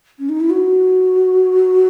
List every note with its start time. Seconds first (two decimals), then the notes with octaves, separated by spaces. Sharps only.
0.19 C#4
0.29 D#4
0.40 E4
0.50 F#4